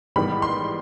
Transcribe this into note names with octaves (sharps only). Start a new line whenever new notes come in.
A1 G#2 D#3 G3 B3 B5
C6